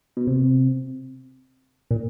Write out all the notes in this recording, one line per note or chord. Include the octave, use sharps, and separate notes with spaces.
B2
C3
A#2